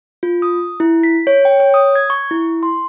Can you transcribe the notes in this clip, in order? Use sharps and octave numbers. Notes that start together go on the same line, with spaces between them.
F4
D#6
E4
B6
C#5
G5
C#5
D#6
G#6
C#6
E4
C6